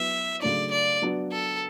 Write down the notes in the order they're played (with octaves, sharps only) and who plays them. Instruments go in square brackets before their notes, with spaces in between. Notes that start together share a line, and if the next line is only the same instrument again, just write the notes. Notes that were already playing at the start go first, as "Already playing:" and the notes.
Already playing: [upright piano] F#3 B3 E4 [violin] E5
[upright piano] C#3 F#3 A3 D4 [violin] D5
[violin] D5
[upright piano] F#3 B3 D4 F#4
[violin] A4